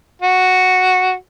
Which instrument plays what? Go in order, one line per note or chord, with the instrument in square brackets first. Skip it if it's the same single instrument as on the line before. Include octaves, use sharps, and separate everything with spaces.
[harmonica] F#4